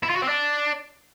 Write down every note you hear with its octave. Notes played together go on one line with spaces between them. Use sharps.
E4
F4
F#4
C4
D4